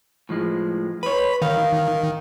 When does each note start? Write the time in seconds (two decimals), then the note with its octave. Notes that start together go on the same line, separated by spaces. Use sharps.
0.29 A2 F3 G#3
1.03 B4 C#5 B5
1.42 D#3 F5